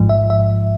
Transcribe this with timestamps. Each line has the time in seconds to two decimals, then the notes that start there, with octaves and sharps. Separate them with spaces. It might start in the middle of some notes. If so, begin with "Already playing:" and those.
Already playing: A1 G#2 F3
0.09 E5
0.30 E5